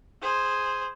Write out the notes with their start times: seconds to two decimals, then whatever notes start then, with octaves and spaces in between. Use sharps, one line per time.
0.21 G#4 C5